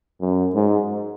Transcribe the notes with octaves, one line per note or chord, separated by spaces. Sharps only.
F#2
G#2